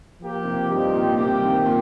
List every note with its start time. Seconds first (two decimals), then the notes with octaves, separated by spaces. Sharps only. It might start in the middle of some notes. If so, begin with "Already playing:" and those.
0.20 F3 A#3 G4
0.44 C3
0.68 G2 F3 D#4 G4
0.93 A#2
1.17 G2 C3 F3 A#3 G4
1.42 D#3
1.66 A#2